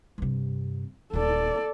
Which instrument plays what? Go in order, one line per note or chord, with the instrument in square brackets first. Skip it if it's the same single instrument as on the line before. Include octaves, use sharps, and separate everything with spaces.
[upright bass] G2 C3
[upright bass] D#1 D#4 [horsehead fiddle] A4 D5